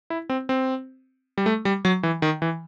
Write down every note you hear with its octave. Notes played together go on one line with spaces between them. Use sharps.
E4
C4
C4
G3
A3
G3
F#3
E3
D#3
E3